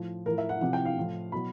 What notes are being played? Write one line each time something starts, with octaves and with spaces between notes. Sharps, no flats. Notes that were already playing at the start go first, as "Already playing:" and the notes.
Already playing: A2 F3
A2 F3 A#4
E5
F#5
C3 F3 F#5
G5
F5
A2 F3
B2 F#3 B5